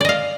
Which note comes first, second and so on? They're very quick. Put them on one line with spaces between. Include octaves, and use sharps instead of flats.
D5 D#5 F5